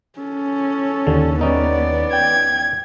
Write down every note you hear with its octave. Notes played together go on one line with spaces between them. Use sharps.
C#4 A4
D#2 D3
G3 B3 C#4 D#4 D5
G5 G#6